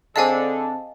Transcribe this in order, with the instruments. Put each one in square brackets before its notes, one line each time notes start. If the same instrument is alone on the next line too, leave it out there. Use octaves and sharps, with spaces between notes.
[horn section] D3 [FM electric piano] C4 G#4 A5 [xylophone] D#5 F5 G#5